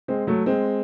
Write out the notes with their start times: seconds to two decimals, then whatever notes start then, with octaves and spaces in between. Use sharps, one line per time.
0.08 G#3 C4
0.27 F#3 A3
0.46 G#3 C4